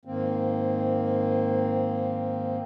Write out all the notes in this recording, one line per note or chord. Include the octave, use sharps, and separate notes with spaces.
G#2 D#3 A#3 C4